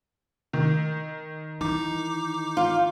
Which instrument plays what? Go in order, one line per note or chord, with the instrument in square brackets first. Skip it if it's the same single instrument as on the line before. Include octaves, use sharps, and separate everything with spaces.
[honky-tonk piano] D#3
[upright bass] E3 [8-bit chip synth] D#4 D6
[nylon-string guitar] F4